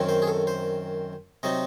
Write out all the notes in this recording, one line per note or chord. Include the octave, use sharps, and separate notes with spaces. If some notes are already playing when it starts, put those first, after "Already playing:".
Already playing: F#2 D#3 F#3 C4
C5
G#4
A4
C5
C3 F#3 C4 D#4 D#5